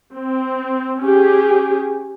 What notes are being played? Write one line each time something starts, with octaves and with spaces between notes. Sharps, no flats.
C4
C#4 G4 G#4